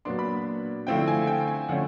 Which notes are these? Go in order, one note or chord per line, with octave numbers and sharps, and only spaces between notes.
A#2 F#3 B3 D4 C6
B5
D3 F3 A3 C4 E4 G5
G#5
G5
G#5
D3 F3 A3 C#4 F#5